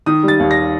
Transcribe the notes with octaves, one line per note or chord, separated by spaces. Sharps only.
D#3 D#6
G3
A6
D#2
A#6